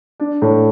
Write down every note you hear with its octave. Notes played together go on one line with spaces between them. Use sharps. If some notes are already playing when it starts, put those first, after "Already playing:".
D4
A2